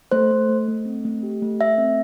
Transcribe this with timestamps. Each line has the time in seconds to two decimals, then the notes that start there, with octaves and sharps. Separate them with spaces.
0.12 A3 C5
0.31 A3
0.49 A3
0.68 A3
0.85 C4
1.05 A3
1.23 G4
1.42 A3
1.61 A3 E5
1.78 C4